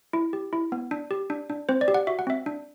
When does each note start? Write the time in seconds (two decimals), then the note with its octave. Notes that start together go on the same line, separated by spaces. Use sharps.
0.13 E4
0.33 G4
0.53 E4
0.72 B3
0.91 D4
1.11 G4
1.30 D4
1.50 D4
1.69 C4 C5
1.81 D5
1.88 G4
1.94 F#5
2.07 F#4 E5
2.19 F#5
2.27 C4 E5
2.46 D4